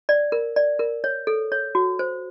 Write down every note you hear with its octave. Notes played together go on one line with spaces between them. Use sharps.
D5
A#4
D5
A#4
C#5
A4
C#5
F#4
C5